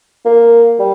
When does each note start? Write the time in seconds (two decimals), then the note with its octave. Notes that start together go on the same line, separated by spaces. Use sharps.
0.25 A#3
0.79 G3